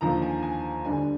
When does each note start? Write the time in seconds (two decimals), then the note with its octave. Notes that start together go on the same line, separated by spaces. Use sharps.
0.01 D#2 D3 F3 A#5
0.22 G#5
0.43 G#5
0.85 D2 D3 G3 G#5